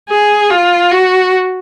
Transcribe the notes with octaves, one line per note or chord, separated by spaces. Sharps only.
G#4
F4
F#4